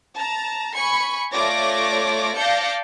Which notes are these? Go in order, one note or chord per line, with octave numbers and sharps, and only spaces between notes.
A5 A#5
G#5 B5 C#6 C#7
A3 F4 C#5 D5 D6 A#6
D5 F5 A5 G6 A#6 C#7